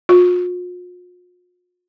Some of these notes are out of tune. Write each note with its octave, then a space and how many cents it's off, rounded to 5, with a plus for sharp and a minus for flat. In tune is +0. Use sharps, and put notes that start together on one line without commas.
F4 +45